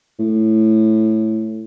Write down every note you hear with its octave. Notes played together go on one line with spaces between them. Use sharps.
A2